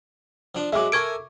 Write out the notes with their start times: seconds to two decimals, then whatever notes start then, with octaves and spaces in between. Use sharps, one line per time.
0.55 F3 D4
0.73 F#3 G#3 E5 D6
0.92 A4 A#4 G#5 C#6 G#6 D7